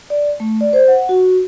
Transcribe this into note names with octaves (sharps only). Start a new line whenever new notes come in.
D5
A3
D5
C5
F#5
F#4